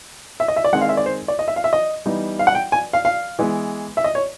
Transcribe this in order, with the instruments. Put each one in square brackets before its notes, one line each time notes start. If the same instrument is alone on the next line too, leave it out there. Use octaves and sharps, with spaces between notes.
[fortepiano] E5
D#5
E5
D5
D#3 G#3 C4 F#5
F5
E5
D5
C5
D5
D#5
E5
F5
E5
D#5
E3 G3 B3 D#4
F5
F#5
G5
G#5
F5
F5
E3 G#3 B3
E5
D#5
C#5